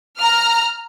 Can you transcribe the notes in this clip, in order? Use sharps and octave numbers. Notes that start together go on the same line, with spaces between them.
A#5 F6